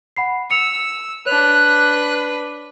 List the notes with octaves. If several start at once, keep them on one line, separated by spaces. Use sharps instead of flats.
F#5 B5 C7
E6 C#7 F7
D4 B4 C#5 F#6 F7